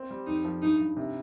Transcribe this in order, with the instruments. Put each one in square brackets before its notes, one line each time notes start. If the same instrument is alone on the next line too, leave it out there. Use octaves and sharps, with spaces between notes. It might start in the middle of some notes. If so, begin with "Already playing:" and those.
Already playing: [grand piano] C4
G3
[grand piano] F2 [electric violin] D#4
[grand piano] F3
[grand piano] G2 [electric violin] D#4
[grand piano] G2
C3